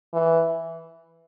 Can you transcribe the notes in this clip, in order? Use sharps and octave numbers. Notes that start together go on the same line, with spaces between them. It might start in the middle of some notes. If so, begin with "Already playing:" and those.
E3